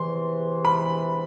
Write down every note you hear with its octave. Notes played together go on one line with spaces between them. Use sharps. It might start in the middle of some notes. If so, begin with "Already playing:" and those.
Already playing: E2 C3 E3 C6
B5